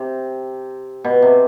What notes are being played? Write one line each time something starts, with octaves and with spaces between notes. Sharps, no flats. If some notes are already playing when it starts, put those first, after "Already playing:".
Already playing: C3
B2
C3